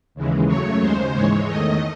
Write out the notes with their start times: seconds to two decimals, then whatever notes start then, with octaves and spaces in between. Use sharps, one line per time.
0.15 D#2 C#3 E3 G#3
0.48 F#2 C#3 F#3 A3 C#5
0.81 D#2 C#3 G#3 C5
1.14 G#2 E3 G#3 C#5
1.47 E2 D#3 A3 D#5